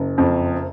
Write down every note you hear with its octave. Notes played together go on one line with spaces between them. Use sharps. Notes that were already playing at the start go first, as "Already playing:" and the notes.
Already playing: F#1
F2